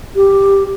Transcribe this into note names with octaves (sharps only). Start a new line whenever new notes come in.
G4